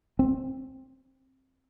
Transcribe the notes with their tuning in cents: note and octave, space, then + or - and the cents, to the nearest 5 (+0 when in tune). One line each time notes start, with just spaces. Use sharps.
C4 +15